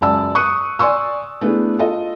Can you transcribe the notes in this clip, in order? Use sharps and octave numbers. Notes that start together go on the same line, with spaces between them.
C#2 F#2 D5 A5 E6
C#6 D#6 F#6 C#7 D#7
D5 G#5 C6 C#6 E6
A3 B3 D4 E4 G#4
F4 A4 D#5